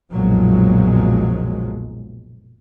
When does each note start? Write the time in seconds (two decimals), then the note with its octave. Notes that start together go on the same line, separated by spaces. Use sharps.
0.13 F#1 B1 A#2 F3 F#3 G#3